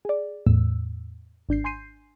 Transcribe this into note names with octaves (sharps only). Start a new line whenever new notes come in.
G#4 D5
E2 A2 E6
G#1 D4 G6 C7
G#5 C6 G6 C7 D#7